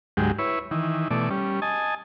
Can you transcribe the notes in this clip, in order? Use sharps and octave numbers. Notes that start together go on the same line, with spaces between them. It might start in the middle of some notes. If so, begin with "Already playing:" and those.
D2 G#2 F#3 G#3 G4
E4 B4 C#5
D#3 E3
B2 E3 A3 D5
G3 C#4
D#5 G#5 A5